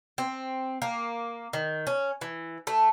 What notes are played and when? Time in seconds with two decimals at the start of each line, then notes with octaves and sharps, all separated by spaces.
0.18 C4
0.82 A#3
1.53 D#3
1.87 C#4
2.21 E3
2.67 A3